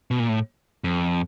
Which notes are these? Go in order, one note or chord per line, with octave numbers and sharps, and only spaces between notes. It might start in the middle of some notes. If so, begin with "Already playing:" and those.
B2
A#2
A2
F2